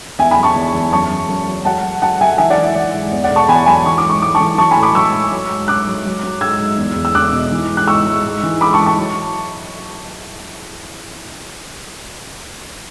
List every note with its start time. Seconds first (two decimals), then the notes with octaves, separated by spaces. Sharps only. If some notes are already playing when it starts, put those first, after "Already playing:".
0.19 E2 E5 G#5
0.31 G#5 B5
0.37 F#3
0.43 A5 C#6
0.56 E2
0.75 E2
0.93 F#2 A5 C#6
1.11 F#2
1.29 F#2
1.47 F#3
1.65 F#3 F#5 A5
1.83 F#3
2.02 F#3 F#5 A5
2.21 F#3 E5 G#5
2.38 E3 E5 G#5
2.50 D5 F#5
2.58 E3
2.63 E5
2.75 E3 D5
2.94 G#2
3.12 E2 D5
3.24 D5 F#5
3.30 B2
3.36 A5 C#6
3.49 E2 G#5 B5
3.66 F#3 G#5 B5
3.86 E3 C#6
3.98 D6
4.03 G#2
4.10 C#6
4.21 G#2 D6
4.35 A5 C#6
4.40 E3
4.58 F#3 A5 C#6
4.71 G#5 B5
4.77 A2
4.83 B5 D6
4.95 F#3 C#6 E6
5.13 A2
5.32 F#3
5.50 G#2
5.68 G#2 D6 F#6
5.87 F#3
6.05 F#3
6.23 F#3
6.41 G#2 E6 G#6
6.59 G#2
6.78 E2
6.96 E2
7.05 E6
7.15 E2 D6 F#6
7.33 B2
7.52 E3
7.69 G#2
7.77 F#6
7.88 G#2 C#6 E6
8.07 G#2
8.25 G#2
8.43 E3
8.61 G#2 B5 D6
8.73 A5 C#6
8.80 E3
8.86 A5 C#6
8.98 F#3